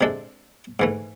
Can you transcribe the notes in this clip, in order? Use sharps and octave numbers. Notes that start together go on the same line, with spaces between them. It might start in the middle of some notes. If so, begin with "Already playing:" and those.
C3 G#3 D4 A4
G#2 E3 A3